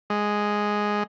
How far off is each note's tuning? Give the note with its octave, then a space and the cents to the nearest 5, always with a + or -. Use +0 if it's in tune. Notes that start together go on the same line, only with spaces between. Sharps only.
G#3 +0